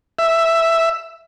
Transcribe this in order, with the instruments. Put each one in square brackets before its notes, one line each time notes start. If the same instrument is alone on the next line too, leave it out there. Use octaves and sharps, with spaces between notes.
[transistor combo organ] E5